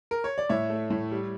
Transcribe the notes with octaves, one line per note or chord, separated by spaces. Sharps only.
A#4
C#5
D5
A2 C#5 E5
A3
A2
G3